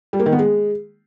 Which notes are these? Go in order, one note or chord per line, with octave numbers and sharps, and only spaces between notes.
G3
A#3
D#3
B3
G#3